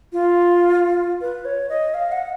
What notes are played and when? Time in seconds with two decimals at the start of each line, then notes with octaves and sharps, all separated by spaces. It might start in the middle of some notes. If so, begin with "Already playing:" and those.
0.13 F4
1.21 B4
1.45 C#5
1.69 D#5
1.94 F5
2.12 F#5